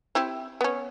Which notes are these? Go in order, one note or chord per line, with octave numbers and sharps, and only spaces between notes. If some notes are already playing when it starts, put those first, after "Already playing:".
C4 E4 G4
B3 C#4